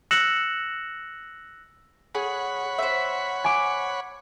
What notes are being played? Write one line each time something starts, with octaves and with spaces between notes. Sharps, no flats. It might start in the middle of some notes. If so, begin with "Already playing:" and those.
E6 F#6 A#6 C#7 E7 F#7
G#4 C#5 F#5 B5
C5 E5
G#5 D6